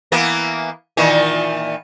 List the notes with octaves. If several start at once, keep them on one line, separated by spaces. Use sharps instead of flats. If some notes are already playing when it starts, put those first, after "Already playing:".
E3 A#3 B3
A#2 D#3 E3